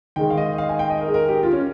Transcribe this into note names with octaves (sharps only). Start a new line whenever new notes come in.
D#3 G#3 G5
F5
D#5
F5
G#5
G5
D#5
A#4
G#4
A#4
G4
F4
C#4